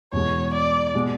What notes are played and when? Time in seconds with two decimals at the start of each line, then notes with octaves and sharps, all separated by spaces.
0.13 E2 B2 G#3 C#5
0.54 D5
0.95 B2 G#3